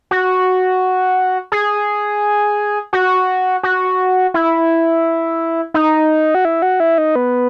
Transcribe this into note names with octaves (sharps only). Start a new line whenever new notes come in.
F#4
G#4
F#4
F#4
E4
D#4
F#4
E4
F#4
E4
D#4
B3